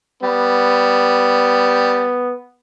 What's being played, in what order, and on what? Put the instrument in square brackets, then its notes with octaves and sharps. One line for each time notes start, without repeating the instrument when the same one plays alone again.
[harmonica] G3 [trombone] B3